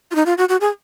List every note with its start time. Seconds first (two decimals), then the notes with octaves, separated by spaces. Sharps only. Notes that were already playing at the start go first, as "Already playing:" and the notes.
0.11 F4
0.15 D#4
0.26 F4
0.38 F#4
0.49 F#4
0.61 G#4